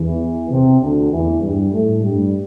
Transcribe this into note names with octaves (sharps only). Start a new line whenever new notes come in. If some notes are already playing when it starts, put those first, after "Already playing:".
Already playing: E2 E3
C3
D2 D3
E2 E3
G2 G3
A2 A3
G2 G3